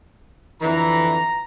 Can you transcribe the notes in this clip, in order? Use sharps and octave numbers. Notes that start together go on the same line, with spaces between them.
F2 D3 E3 A#5